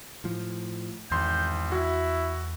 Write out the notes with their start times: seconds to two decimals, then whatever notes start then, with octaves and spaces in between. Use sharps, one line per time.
0.24 A2 F3
1.11 G#1 E2 C6 G6
1.72 E4 F#4